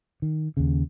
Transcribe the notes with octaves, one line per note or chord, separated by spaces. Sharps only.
D#3
D#2 C#3